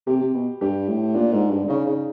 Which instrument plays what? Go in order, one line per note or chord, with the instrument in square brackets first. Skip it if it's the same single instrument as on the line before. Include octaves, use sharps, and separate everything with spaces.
[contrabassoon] C3 [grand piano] G4
[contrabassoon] C3
B2
[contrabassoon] G2 [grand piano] G4
[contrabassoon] A2
[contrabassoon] A#2 [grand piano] D4
[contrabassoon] G#2
G2
D3
[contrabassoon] C#3 [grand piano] D#4
[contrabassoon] C#3